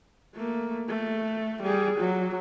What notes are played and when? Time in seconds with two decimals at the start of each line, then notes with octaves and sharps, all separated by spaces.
0.36 A3 A#3
0.89 A3
1.63 G3 G#4
1.99 F#3